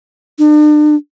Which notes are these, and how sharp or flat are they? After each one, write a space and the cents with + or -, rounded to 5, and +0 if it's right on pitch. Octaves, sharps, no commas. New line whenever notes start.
D4 +40